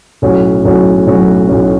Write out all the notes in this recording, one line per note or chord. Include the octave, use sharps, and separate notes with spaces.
B1 A2 F#3 C#4 F#4
B1 A2 F#3 C#4 F#4
B1 A2 F#3 C#4 F#4
B1 A2 F#3 C#4 F#4